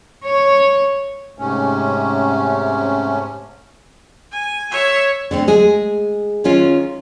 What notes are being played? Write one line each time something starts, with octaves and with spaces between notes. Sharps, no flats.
C#5
G#2 C3 A3 C#4
G#5
C#5 E5
D3 A3 C4
G#3 G#4
D#3 G#3 C#4 F4